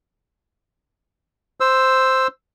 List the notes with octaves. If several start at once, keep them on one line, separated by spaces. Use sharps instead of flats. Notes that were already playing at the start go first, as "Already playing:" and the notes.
C5 E6